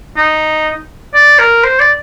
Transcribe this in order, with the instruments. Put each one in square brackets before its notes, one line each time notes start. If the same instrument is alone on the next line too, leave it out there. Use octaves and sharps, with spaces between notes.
[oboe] D#4
D5
A#4
C5
D5